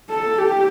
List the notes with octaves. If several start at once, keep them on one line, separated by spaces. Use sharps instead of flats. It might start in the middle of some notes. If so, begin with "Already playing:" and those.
A4
G4